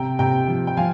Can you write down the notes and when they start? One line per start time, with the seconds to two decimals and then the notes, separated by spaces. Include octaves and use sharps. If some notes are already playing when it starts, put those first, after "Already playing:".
Already playing: C3 G5 A#5
0.19 C3 G5 A#5
0.48 F3
0.67 G5
0.77 F3 F5 G#5